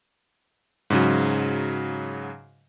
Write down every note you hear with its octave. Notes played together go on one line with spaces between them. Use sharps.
G#2 C#3 F#3